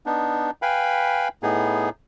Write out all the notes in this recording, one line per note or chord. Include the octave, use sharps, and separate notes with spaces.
B3 D4 D#4
B4 F5 G5 G#5 B5
A2 B3 D#4 G#4